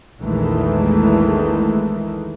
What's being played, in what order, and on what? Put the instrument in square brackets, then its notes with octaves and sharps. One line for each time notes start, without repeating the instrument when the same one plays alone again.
[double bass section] A#1 E2 D#3 E3 G#3 A3